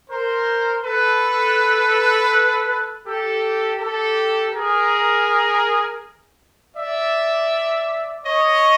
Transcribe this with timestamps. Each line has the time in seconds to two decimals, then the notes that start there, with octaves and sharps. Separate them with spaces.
0.10 A#4 C5
0.85 A4 B4
3.06 G4 A4
3.80 G4 A4
4.54 G#4 A#4
6.77 D5 E5
8.25 C#5 D#5